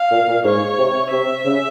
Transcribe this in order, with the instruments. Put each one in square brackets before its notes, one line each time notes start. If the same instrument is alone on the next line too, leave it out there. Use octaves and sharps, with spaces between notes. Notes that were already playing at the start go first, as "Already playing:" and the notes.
Already playing: [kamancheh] F5
[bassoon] A#2
A#2
[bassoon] G#2 [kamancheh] C#5
[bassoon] C3
[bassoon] C3 [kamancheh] E5
[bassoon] C#3